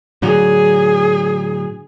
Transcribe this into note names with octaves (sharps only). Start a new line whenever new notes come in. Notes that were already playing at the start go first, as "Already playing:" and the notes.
A2 D3 F#3 G#4